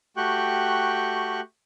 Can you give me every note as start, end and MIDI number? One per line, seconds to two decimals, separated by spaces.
0.17 1.41 57
0.17 1.41 66
0.17 1.41 67
0.17 1.41 79
0.17 1.41 85
0.17 1.41 90